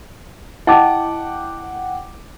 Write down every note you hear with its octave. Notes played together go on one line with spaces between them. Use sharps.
E4 D#5 F#5 G5 A5 D6